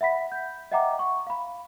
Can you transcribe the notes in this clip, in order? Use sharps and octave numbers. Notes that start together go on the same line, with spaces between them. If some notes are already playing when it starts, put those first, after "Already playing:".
E5 F#5 B5 B6
G6
D#5 E5 F#5 G5 A#5 D6
C#6
F5 B5